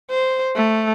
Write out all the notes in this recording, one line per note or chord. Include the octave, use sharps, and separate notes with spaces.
C5
A3